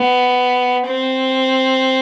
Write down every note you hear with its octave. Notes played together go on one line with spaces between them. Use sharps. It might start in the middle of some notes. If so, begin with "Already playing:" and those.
Already playing: B3
C4